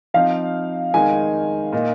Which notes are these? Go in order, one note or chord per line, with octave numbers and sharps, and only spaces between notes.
F3 C4 D#4 F5
D#3 G#3 D#4 G#5
A#2 A#3 D#4